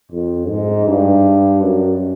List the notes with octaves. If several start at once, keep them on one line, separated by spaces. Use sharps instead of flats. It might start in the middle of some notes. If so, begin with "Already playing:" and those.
F2
G#2
G2
F#2